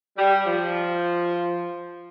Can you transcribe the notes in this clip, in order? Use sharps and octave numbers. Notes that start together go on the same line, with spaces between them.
G3
F3